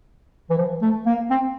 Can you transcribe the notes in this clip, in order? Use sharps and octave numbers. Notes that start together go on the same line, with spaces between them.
E3
F3
A3
A#3
C4